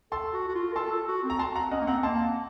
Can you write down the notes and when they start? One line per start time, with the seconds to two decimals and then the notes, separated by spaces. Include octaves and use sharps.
0.12 A4 A5 C6
0.33 F#4
0.48 F#4
0.55 F4
0.72 A#4
0.76 A4 A5 C6
0.92 A4
1.08 F#4
1.24 C4
1.30 A#5
1.39 A5 C6
1.55 F#5 A#5
1.71 C#4 D#5 F#5
1.81 A#3
1.87 C4 F#5 A#5
2.03 A#3 A5 C6